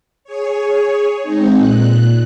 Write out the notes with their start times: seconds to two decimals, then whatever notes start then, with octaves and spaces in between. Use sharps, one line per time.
0.24 G#4 C#5
1.22 G#3 C4 D#4
1.57 A#2 F#6